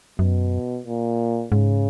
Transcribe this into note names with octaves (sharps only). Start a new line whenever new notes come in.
F#2 B2
A#2
G#2 C#3